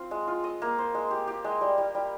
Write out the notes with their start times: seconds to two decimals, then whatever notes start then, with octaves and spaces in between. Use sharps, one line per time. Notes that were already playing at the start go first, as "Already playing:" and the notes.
Already playing: C4 F4
0.11 G#3
0.28 F4
0.44 D#5
0.62 A#3
0.78 C5
0.94 G#3
1.11 G4
1.27 G4
1.44 G#3
1.61 G3
1.78 G3
1.95 G3